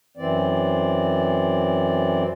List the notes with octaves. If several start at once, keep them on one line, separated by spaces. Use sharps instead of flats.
F#2 E3 C4 D5